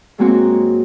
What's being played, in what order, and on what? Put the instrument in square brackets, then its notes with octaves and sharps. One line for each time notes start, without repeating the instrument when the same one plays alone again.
[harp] G#2 F#3 G#3 A#3 C4 F#4